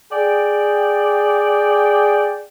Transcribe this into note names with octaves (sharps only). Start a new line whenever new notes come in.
G#4 D5 G5